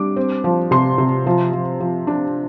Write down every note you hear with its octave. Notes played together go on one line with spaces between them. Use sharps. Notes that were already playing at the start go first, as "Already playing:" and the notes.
Already playing: G3 D4 D6
C4
F3
C3 C6
C3
F3
F3
F3
D4